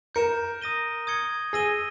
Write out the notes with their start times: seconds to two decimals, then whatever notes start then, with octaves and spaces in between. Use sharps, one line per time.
0.15 A#4 G6 C#7 E7
0.62 D#6 A#6 D#7 G7
1.07 D#6 G#6 C#7 G7
1.53 G#4 E6 A#6 D#7 G7